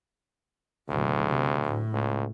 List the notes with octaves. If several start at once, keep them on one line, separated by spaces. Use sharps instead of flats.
F#1 D2 B2
C3
A2
C#2